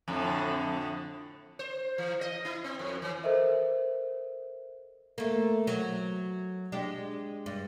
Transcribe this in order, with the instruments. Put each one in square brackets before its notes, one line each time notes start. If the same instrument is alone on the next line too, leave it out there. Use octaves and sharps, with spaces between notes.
[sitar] F2 A2 D3
C5
E3
D#5
E4
C4
F2
E3
[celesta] A4 A#4 C5 D#5 E5
[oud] A3 A#3
F#3
G#3 D4 G4
G2